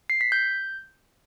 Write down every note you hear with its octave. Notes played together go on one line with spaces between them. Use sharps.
C7
B6
G6